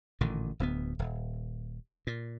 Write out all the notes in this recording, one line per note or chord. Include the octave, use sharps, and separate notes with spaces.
A1 A#2 D3 D#3
D1 D2 A#3 B3
D#1
A#2